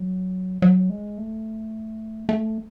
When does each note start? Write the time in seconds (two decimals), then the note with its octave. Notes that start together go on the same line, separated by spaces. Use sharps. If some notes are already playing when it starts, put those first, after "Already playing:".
Already playing: F#3
0.62 F#3
0.90 G#3
1.18 A3
2.29 A3